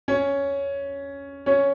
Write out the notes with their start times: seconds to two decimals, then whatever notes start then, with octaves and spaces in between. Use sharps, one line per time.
0.08 C#4 C#5
1.46 C#4 C#5